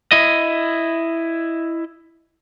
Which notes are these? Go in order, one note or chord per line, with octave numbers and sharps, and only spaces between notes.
E4 D#5